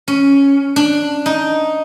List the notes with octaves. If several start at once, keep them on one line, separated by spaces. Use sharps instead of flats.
C#4
D4
D#4